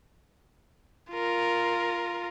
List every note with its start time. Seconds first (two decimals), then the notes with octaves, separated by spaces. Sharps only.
1.11 F4 A#4